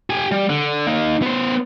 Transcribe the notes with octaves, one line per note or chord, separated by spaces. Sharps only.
G4 G#5
G3
D3
A#3 D#4
B3 C5